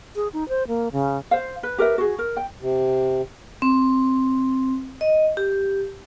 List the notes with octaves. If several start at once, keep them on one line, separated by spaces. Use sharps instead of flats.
G#4
D#4
C5
A#3
C#3
C5 F5
B4
G4 A#4 B4 E5
F#4 G#4
A#4
G5
C3
C4
D#5
G4